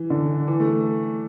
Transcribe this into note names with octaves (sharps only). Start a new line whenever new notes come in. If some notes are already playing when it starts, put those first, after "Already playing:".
Already playing: E3
D3
E3
A3